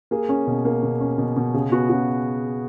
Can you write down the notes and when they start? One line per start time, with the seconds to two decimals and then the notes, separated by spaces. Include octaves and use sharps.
0.11 A#3 G#4
0.29 C#4
0.47 B2
0.65 A#3
0.83 B2
1.00 C#4
1.18 B2
1.37 B2
1.54 C#3 G#4
1.72 B3 F#4
1.89 C#3 F#4